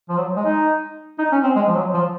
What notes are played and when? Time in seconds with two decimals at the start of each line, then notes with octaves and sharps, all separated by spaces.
0.09 F3
0.17 F#3
0.36 G#3
0.45 D#4
1.19 D#4
1.32 C#4
1.43 C4
1.56 G#3
1.68 F3
1.75 F#3
1.94 F3